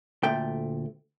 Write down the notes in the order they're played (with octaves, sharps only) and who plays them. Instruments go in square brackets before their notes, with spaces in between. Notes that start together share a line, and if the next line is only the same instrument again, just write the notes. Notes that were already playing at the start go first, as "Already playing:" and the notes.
[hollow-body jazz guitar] D2 A#2 A3 G5